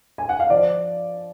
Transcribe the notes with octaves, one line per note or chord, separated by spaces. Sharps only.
G#5
F#5
F5
F3 D5